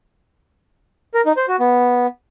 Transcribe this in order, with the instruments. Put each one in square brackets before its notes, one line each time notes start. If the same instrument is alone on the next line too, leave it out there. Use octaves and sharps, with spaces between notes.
[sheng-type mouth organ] A#4
D#4
C5
F#4
B3